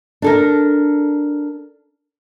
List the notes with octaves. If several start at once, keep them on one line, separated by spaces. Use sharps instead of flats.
D4 A4 A#4